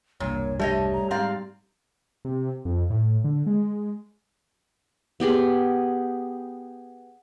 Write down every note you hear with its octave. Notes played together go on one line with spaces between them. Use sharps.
E1 C2 G2 A#2 C#5
G3 A3 C#5 D#5 A5
A#5
G#2 C4 D5 F5 A#5
C3
F2
A2
D3
G#3
B3 G4 G#4 B4